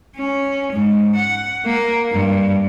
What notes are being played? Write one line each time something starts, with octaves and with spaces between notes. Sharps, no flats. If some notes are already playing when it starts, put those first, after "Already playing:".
C#4
G#2
F#5
A#3
G2